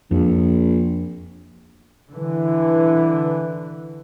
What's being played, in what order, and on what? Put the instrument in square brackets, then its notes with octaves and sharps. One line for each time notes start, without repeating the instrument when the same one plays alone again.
[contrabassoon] A#1 [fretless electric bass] F2
[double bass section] D3 E3